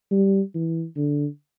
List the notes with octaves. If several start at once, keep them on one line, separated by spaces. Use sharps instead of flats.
G3
E3
D3